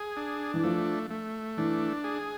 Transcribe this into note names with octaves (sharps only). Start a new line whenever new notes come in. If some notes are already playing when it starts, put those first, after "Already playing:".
Already playing: G#4
D4
E3
F3 A3
A3
E3 D4
G#4